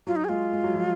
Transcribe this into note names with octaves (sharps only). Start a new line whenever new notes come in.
F#3 F4
D#4
G#4
G#3 F4
G#3
F#3
F3